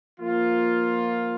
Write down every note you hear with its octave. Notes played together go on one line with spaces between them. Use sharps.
F3 A#3 F4